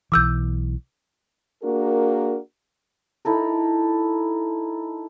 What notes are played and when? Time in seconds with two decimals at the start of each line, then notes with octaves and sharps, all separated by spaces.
0.12 B1 E3 D6 E6 G6
1.63 A#3 D4 F#4 G#4 A#4
3.25 D#4 E4 A4 A#4